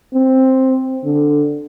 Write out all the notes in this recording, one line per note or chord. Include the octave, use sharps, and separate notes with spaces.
C4
D3